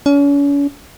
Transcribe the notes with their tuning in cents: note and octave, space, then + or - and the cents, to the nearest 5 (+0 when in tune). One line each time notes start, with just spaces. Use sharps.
C#4 +40